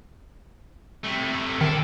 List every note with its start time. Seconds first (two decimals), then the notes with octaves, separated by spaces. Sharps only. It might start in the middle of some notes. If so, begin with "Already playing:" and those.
1.04 C3 A3
1.61 D#3 D4 A4